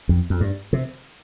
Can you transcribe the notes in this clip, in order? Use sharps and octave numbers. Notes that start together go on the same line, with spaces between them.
F2
F2
G2
C3